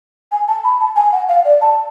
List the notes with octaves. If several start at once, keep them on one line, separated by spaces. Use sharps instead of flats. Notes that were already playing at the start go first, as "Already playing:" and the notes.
G#5
A5
B5
A5
G#5
F#5
F5
D5
A5